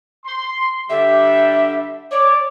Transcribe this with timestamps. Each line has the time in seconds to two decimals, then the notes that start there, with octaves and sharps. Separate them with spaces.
0.25 C6
0.90 D3 G3 G4 E5
2.11 C#5 D5